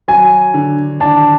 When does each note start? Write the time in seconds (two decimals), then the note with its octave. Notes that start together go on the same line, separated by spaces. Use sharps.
0.08 F#3 G#5
0.54 D3
1.00 D4 A5